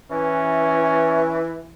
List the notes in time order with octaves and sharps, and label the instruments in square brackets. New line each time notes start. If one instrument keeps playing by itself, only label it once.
[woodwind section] E3 [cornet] C#4